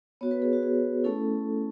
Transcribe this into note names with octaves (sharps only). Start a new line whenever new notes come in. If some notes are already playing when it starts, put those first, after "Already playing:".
B3 F#4 C#5
B4
G#4
F#4
G#4
A3 C#4 E4 A4